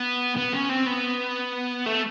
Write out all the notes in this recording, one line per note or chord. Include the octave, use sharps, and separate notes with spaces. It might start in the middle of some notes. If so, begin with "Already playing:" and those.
Already playing: B3
B3
C#4
C4
B3
A3